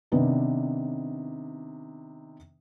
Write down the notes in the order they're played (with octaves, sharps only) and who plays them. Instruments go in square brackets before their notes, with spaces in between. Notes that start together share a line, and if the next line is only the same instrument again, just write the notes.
[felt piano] C3 D#3 B3 D4 D#4 B4